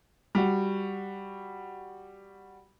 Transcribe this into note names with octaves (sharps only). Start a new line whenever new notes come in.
G3 F#4